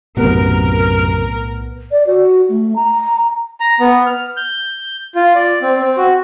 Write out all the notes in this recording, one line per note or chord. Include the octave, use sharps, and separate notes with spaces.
B1 F#2 A2 C3 B3 A#4
D5
F#4
A3
A#5
A#5
B3
F6
G6
F4
D5
C4
C4
F#4